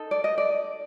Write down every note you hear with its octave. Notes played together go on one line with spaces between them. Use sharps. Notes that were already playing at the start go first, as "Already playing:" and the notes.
Already playing: D#4 A4
D5
D#5
D5